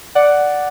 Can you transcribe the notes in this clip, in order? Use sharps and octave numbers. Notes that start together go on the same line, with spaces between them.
D5 F#5